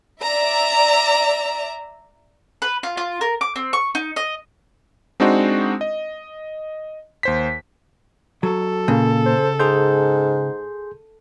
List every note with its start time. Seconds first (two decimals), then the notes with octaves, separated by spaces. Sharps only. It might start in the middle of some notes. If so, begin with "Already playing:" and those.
0.22 D5 E5 A#5
2.62 B4
2.83 F4
2.97 F4
3.21 A#4
3.41 D6
3.56 C4
3.73 C#6
3.95 D#4
4.16 D#5
5.20 G#3 C4 D4 D#4 F#4 C5
5.81 D#5
7.23 D#2 C5 B6
8.43 F#3 A4
8.88 A#2 C#3 A#3
9.26 C5
9.60 G#2 G#4 C6 G6